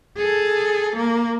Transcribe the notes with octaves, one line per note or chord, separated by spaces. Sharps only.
G#4 A4
A#3